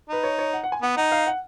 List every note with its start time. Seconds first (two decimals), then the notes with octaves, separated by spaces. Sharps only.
0.09 D#4 B4
0.23 C#5
0.38 C#5
0.53 F#5
0.63 F#5
0.72 G#5
0.82 B3 F#5
0.97 D#4 F#5
1.12 F5
1.27 F#5